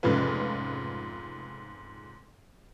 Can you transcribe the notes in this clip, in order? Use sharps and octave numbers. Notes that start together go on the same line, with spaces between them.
F1 G#2 C#3 F3 C#4 B4